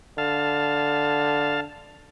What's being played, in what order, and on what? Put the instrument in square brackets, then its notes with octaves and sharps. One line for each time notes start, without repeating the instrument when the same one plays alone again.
[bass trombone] D3 [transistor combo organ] F5 A5